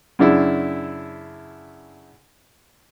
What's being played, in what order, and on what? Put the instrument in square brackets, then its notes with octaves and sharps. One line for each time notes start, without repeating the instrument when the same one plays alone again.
[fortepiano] F#2 C#3 D4 E4